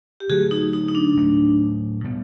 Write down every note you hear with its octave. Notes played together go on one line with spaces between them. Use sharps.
G4
D3 F#3 A3 F#4 G#4
D#4
D#4
D#4
D4
A2 F#3 A3
B2 G3 B3